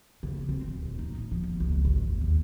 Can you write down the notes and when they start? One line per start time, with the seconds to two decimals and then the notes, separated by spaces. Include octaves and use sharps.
0.23 C#3
0.49 C4
0.66 D1
0.83 D#1
0.99 D#4
1.16 A2
1.32 F3
1.44 F1
1.60 C#2
1.85 G#1
2.03 E2
2.21 D#2